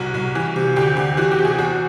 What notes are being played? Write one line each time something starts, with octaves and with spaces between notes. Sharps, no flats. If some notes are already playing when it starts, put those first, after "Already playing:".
Already playing: C2 F#4
C2
E3
C3
D2 G4
D2
E3 F#4
G4
C3
G#4
E2 F#4